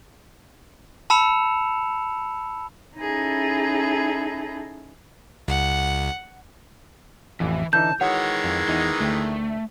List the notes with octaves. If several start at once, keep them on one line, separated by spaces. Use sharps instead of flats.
A5 B5 E6 C#7 E7 F7
C#4 D#4 E4 G#4 A4
C#2 F#5
A1 F2 E3
D3 E3 D#4 A5 G6
D#3 E3 G#3 F#4 C#5 F#5
F2
E2 D#4
D2 A3 G5